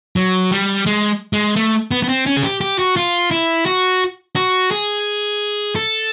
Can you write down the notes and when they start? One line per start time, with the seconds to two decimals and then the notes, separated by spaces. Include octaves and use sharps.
0.16 F#3
0.51 G3
0.86 G#3
1.33 G#3
1.56 A3
1.91 B3
2.03 B3
2.09 C4
2.26 C#4
2.37 G#4
2.44 G4
2.61 G4
2.79 F#4
2.96 F4
3.31 E4
3.66 F#4
4.36 F#4
4.71 G#4
5.76 A4